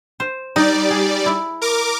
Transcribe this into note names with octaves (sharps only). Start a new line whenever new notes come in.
C5
G3 D#4 D5
G#4
E4
A#4 D6